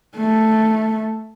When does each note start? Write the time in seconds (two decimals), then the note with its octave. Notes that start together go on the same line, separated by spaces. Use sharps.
0.17 A3